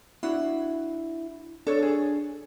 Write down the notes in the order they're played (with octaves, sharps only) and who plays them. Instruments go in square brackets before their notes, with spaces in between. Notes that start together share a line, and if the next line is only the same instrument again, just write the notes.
[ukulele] D4 F#4 [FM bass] E4
[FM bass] D4 [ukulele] A4 C#5
[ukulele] G#4